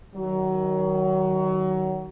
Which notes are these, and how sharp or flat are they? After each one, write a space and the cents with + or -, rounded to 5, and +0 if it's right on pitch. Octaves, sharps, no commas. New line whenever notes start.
D#3 +0 F#3 +25